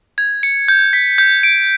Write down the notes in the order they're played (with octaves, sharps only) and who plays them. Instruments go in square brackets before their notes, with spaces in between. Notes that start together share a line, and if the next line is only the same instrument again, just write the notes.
[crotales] G#6
C#7
G6
B6
G6
D7